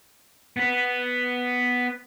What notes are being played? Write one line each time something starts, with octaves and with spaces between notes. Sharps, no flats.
B3 B4